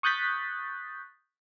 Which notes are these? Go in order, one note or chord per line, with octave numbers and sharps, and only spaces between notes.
C#6 D#6 F#6 G6 A6 B6